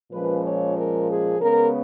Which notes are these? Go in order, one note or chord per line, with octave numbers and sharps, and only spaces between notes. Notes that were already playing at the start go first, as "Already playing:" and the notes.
A#2 F3 G#3 C#4 B4
C#5
A#4
G#4
C#3 G#3 B3 A#4